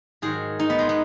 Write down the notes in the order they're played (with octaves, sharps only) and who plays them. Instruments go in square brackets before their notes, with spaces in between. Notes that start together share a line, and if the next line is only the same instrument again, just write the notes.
[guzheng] G#2 D#3 F#3 G#4
D#4
B3
G#3
B3